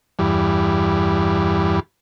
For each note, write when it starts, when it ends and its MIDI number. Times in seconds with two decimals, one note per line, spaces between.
0.19 1.80 40
0.19 1.80 43